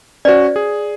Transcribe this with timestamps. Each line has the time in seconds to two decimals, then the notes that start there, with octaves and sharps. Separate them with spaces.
0.25 C#4 F#4 C5 D5
0.56 G#4